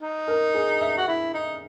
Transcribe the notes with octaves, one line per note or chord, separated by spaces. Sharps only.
D#4
A#4
G#4
E5
F#4
E4
D#4